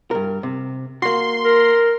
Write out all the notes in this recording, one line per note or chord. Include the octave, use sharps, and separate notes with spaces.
G2 A#4
C3
A#3 F#4 C6
A#4